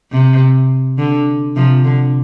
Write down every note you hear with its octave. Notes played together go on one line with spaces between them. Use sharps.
C3
D3
C3 F3
D3